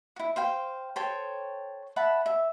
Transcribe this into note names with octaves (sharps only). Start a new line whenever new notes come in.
E4 F#4
C5 F5 G5
A4 C5 C#5 G5
E5 F#5 A5 B5
E5